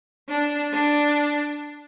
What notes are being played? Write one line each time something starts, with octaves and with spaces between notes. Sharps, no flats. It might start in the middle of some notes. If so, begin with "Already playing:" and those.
D4
D4